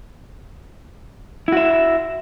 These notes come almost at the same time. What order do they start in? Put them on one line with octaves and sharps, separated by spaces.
E4 F#4 E5